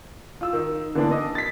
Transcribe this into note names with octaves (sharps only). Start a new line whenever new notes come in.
F4 E6
D#3
D3 E3 A#3 B3 D4
D#5
A6 B6